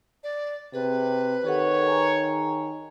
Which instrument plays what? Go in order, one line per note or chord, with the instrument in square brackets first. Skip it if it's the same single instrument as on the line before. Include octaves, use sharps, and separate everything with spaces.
[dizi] D5
[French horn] C3 [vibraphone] G#4 [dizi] B4
[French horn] D#3 [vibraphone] G4 A4 F#5 [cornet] C#5
[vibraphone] G#4 G#5 A#5